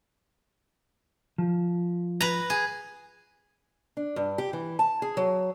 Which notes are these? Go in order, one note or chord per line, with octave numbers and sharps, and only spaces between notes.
F3
B4 A#5
G#4
D4
G2
G4
E3
A5
G#4
F#3